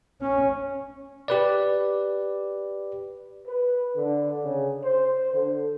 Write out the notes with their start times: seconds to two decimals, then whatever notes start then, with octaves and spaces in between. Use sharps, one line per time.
0.21 C#4
1.28 G4 B4 D5
3.47 B4
3.97 D3
4.43 C#3
4.83 C5
5.33 D3